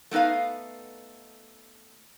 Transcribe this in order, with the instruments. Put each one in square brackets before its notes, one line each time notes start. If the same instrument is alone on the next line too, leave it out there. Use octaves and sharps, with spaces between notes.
[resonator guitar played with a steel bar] A3 B3 D#4 B4 F5